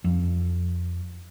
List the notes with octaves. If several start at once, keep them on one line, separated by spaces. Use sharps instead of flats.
F2